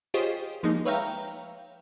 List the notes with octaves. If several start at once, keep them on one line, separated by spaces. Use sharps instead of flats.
F4 G4 G#4 C5 C#5 D#5
F3 G#3 A#3 D#4
B4 C#5 E5 F5 G5 A#5